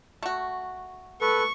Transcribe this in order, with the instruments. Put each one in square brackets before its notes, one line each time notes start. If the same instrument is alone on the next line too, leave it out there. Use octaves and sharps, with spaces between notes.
[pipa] A3 F#4
[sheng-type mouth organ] A4 B4 [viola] C#6